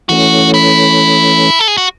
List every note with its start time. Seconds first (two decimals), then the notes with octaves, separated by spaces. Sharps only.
0.09 E3 A3 C#4 F#4
0.54 E4
1.59 A4
1.68 G#4
1.78 F#4